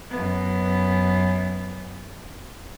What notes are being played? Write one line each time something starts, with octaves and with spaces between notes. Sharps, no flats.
F#2 B3